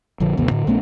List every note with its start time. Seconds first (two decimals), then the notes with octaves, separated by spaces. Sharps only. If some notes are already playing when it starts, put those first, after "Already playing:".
0.20 A#1 D3 F3
0.37 A1 D#2 C3 B3
0.51 A2 D3
0.67 A#1 A3 B3 C#4